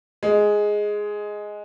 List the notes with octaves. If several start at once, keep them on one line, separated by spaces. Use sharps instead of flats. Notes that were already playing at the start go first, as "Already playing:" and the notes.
G#3